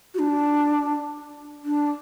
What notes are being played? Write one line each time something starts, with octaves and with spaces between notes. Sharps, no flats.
F#4
D4
D4